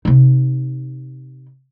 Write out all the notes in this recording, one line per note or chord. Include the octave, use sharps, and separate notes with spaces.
C3 D#4